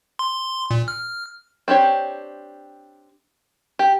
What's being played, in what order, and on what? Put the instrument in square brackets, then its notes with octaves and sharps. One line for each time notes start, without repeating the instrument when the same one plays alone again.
[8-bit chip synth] C6
A#2
F6
[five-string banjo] C4 D4 G4 C#5
G4